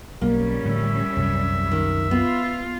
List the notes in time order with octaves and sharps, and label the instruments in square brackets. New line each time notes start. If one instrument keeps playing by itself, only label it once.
[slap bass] B1 [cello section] G3 C#4 [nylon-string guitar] A#3
[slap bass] A2 D3 F3 [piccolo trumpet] E5
[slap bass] C2 F#2 C3
[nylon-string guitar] D#3
[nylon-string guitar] B3 [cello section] F4